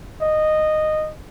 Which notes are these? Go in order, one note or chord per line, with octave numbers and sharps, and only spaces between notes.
D#5